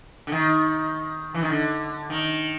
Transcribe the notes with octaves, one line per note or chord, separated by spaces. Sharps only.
D3
D#3
E3
D#3
D3
D#3